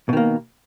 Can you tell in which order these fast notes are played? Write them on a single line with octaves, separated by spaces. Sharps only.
B2 D#3 A#3